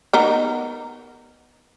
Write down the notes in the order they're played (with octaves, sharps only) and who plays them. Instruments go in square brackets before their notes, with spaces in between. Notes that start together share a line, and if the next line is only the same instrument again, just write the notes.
[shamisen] B3 D#4 A#4